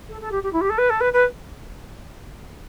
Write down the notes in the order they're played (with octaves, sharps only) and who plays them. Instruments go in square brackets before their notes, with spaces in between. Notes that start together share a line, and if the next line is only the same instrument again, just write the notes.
[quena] A4
A4
G4
G4
E4
G4
A4
B4
A4
B4
B4